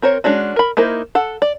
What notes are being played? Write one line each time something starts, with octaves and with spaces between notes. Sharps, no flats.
C4 A#4 C5 C#5
G#3 C#4 D4 F#4
A#4 B5
A#3 D#4 E4 A#4 C5
A4 F#5
D5